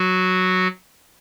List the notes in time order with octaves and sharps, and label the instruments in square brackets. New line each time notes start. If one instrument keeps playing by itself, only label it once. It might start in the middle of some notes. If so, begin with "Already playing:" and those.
Already playing: [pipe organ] F#3 F#4